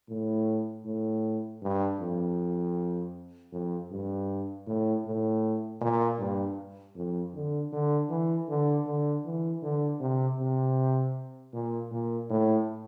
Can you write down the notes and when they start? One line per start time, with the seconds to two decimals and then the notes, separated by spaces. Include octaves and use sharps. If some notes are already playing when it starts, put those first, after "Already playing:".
0.09 A2
0.85 A2
1.62 G2
2.00 F2
3.52 F2
3.91 G2
4.66 A2
5.05 A2
5.81 A#2
6.19 G2
6.95 F2
7.34 D3
7.72 D3
8.09 E3
8.48 D3
8.86 D3
9.25 E3
9.62 D3
10.00 C3
10.39 C3
11.53 A#2
11.91 A#2
12.30 A2